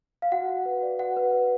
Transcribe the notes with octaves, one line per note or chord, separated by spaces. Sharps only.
F5
F#4 F#5
F#4
B4
D5
F#4 F#5
B4
B4